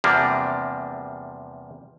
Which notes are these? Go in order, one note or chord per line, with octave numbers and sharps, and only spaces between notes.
E2 C3 F3 G3 A#3 D4